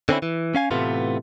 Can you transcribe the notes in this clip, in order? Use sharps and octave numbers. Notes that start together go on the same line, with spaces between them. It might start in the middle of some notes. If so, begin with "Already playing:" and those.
D3 C4 C#4 E4
E3
C#4 F5 G#5
A2 C3 E3 A3 B3 F4